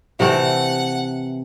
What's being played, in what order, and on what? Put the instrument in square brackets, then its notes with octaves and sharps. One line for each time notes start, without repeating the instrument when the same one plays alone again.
[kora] C3 E3 A3 [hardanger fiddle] F#5